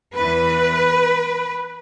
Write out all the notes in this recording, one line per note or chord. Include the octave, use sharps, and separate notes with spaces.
E2 E3 B4